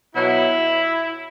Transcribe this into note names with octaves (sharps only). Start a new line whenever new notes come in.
B2 F#3 E4